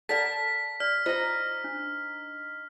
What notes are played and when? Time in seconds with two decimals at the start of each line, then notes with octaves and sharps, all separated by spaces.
0.09 A4 A#4 D5 F#5 A5 B6
0.80 D5 F6
1.06 D#4 F4 C5 D#5 A#5
1.64 D4